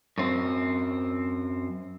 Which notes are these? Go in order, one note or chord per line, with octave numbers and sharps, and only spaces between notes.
F#2 C4